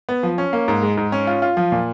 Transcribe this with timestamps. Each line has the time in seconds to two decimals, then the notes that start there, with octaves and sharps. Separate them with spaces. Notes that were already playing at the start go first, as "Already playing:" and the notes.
0.09 B3
0.23 F3
0.38 C#4
0.53 A#3
0.68 G#2
0.83 G#3
0.97 G#2
1.12 C#4
1.27 F4
1.42 F4
1.57 F3
1.72 A#2